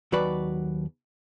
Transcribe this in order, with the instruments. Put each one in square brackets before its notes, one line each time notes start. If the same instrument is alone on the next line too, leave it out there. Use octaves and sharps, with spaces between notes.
[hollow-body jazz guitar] D#2 F#3 F#4 B4 D5 B5